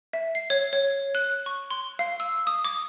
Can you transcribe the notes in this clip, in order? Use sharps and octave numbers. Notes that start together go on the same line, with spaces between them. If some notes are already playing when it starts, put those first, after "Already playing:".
E5
C7
C#5
C#5
F#6
C#6
C6
F5
E6
D#6
D6